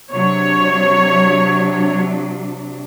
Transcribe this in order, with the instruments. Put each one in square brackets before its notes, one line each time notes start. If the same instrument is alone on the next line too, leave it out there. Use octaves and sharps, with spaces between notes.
[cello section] C3 F#3 D4 [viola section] C#5